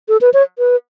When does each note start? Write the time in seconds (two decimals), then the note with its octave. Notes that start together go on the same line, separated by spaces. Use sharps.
0.08 A4
0.21 B4
0.34 C#5
0.59 B4